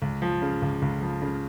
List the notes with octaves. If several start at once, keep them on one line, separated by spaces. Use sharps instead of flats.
C#2
F3
C#3
C#2
C#2
F3
C#3